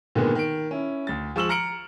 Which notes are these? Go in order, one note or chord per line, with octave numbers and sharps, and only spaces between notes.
A#2 D3 D#3 G#3 A#3 B3
D#3 D7
C#4 E4
D2 A6
F3 G#3 C#6 E6 E7 F#7
A#5 F6 C#7 D7 F#7